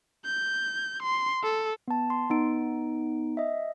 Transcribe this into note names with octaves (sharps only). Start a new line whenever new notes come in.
G6
C6
A4
B3 A5
C6
B3 D#4 D7
D#5 E5